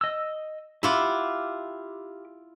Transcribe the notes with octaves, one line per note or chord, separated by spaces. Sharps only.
D#5 E6
E4 F4 G4 F#5 D6